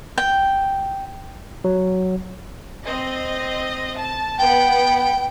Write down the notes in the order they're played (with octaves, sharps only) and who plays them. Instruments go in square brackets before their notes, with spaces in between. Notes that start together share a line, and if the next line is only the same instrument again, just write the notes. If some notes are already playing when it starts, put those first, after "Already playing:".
[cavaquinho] G5
[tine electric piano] F#3
[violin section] C4 D#5
A5
[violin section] B3 [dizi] G5